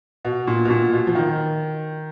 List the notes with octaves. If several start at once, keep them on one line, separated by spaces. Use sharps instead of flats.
B2
A#2
B2
A#2
B2
F3
D#3